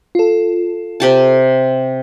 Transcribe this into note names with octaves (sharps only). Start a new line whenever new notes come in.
F4 A4
C3 G4 A5